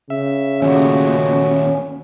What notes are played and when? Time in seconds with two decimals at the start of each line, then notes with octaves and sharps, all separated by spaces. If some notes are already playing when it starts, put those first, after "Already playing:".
0.10 C#3 E5
0.62 D#2 A#2 A3 C#4 F#4